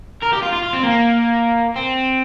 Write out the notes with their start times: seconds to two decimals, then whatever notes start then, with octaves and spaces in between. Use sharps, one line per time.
0.22 A#4
0.33 G4
0.42 F4
0.52 F4
0.63 F4
0.73 C4
0.83 A#3
1.76 C4